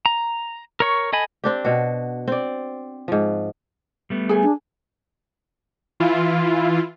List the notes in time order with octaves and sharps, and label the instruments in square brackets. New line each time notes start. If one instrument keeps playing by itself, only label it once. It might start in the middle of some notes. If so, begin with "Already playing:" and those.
[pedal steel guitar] A#5
A#4 C#5 C#6
A4 D#5 G#5 B5
[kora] C4 D4 G4
B2 F#4
C4 D5
G#2 F3
[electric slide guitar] G3 A3 B3
[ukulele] G#4 G#5
[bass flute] D4
[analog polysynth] E3 E4 F4